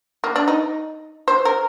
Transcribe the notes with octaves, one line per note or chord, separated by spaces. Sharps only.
A#3
D4
D#4
C5
A#4